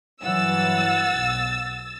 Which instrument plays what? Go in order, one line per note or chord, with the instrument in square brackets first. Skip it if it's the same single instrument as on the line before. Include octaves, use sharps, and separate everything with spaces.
[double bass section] G2 E3 F#3 [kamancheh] F#5 [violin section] E6 A6
[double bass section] B1